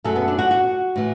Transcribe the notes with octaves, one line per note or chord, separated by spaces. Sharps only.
F#2 F#3 A3 A4
B3
D4
F#4
F#4
A2 E3